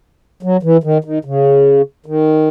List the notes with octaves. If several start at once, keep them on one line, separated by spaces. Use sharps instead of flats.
F#3
E3
D#3
D#3
C#3
D#3